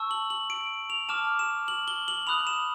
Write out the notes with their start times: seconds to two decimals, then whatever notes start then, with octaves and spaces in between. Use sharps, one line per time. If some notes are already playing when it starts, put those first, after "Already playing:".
Already playing: A5 C#6 E6
0.11 F#7
0.30 F#7
0.50 D7
0.90 F7
1.09 A5 D6 F6 E7
1.39 E7
1.68 F#7
1.88 G7
2.08 F#7
2.27 B5 D#6 F#6 F7
2.47 E7